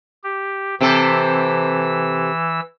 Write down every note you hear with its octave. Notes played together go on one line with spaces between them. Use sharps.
G4
C3 E3 C4 A4 E6